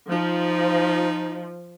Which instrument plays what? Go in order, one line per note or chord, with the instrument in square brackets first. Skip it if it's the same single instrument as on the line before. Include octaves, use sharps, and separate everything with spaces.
[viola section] F3 [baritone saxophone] D#4